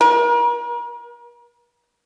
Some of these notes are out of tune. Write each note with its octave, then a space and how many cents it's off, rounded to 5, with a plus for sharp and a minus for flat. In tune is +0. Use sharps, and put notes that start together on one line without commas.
A#4 +40